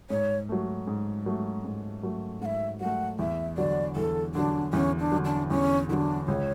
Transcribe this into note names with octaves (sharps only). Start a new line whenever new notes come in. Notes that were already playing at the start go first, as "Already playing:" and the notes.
G#2 C#5
F#3 A3
G#2
F#3 A3
G#2
F#3 A3
G#2 E5 F#5
F#3 A3 F#5
E2 E5
D3 F#3 D5
E2 A4
D3 F#3 D4
E2 C#4
D4
D3 F#3
D4
E2 C#4
D3 F#3 D4 E4
C#2 C#5